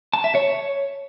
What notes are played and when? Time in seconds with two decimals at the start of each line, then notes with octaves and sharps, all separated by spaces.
0.13 A5
0.24 E5
0.35 C#5